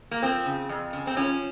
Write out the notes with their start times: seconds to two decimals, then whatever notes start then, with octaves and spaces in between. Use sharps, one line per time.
0.11 A#3
0.22 F3 C4
0.45 C#3
0.69 F2
0.93 C#3
1.07 C4
1.16 F3 C#4